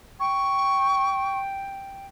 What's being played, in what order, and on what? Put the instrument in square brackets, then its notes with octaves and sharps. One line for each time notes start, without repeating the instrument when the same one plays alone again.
[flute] G5 [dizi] C#6